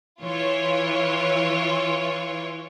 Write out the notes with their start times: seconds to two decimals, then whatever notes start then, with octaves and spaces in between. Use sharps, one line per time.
0.22 E3 F4 C#5